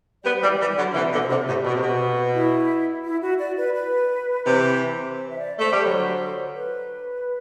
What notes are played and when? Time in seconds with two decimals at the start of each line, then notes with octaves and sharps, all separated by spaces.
0.24 G3 B3 D5
0.36 C5
0.41 E3 G3
0.47 D5
0.59 E3 G3
0.76 D3 F#3
0.94 C3 E3 E5
1.11 B2 D3 F#5
1.21 C5
1.29 C3 D5
1.47 A2 G4
1.64 B2
1.74 C3
1.82 B2
2.35 E4
3.04 E4
3.22 F#4
3.39 D5
3.57 B4
3.74 B4
4.44 C3 E3
5.16 C5
5.30 E5
5.39 D5
5.58 A3 C5
5.71 G3
5.85 D3 F#3 C5
6.55 B4